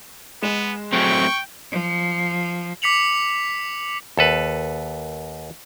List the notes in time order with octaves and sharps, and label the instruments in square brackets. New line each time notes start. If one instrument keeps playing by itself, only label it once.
[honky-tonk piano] G#3 E7 [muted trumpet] B3
[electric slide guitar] F#3 A3 C4 [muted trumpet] G5 [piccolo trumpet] C#6
[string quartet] F3
[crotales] D6 B6 C#7 F7 F#7
[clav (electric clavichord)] D#2 A4 B4